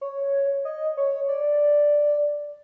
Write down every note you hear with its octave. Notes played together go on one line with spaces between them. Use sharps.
C#5
D#5
C#5
D5